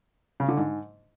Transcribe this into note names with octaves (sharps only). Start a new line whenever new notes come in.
C#3
D3
G#2